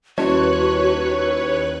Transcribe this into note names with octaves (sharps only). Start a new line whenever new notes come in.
D#2 G3 C#4 E4 F#4 B4 C#5 F#6